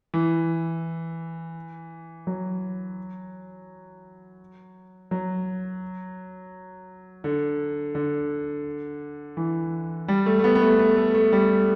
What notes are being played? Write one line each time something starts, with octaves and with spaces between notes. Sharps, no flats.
E3
F#3
F#3
D3
D3
E3
G3
A3
A3
B3
B3
A3
A3
A3
A3
G3